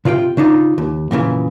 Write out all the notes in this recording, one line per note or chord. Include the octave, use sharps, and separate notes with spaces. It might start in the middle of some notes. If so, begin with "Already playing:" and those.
C3 F4 D5 G5
C#3 D4 D#4 F4
D#2
F2 A#2 C#3 E3